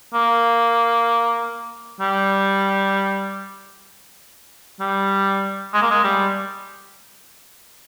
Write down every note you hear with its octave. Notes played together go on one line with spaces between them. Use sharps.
A#3
G3
G3
G#3
A#3
G#3
G3